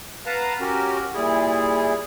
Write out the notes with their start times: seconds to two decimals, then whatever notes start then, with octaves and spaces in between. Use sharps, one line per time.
0.26 B4 F5 F#5 A5 A#5
0.60 C#4 F#4 G4 A#4
1.14 A#2 G3 E4 G#4